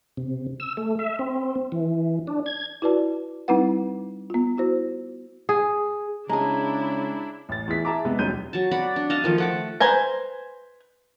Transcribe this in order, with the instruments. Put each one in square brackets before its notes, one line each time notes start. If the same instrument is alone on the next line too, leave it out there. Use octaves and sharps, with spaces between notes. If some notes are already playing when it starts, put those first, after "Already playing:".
[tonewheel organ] C3
E6
A3
E5
C4
E3
D4
G#6
[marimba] E4 F#4 B4 D5 A5
G3 C4 D#4 E4 B4 F#5
B3 F4
E4 F#4 C5
[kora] G#4
[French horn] C#3 [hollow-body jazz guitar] G#3 G#4 [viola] D4 E4 [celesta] A5 A#5
[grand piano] A1 A6
E2 E3 E4 G#4 B6
G#4 E5 A5 A#5 D6
C3 G#3 B3
E1 F#3 G3 D#4 G6 D#7
[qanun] F#3 A5
D5 F#5 B5
D4
D#5 F5 A5
D#3 F3 A3
A3 F#5 D6
[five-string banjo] B4 C5 G#5 A#5